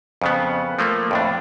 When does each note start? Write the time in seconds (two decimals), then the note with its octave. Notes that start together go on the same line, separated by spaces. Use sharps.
0.22 F2 C#3 B3
0.79 F3 A3 A#3
1.11 F2 A2 D4